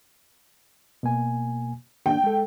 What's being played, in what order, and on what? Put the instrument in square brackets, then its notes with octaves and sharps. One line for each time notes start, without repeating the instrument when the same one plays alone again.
[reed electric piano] B2 A#3 G#5
[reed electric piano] D#3 A#3 D4 [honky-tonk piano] G5
[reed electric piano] G#3 A4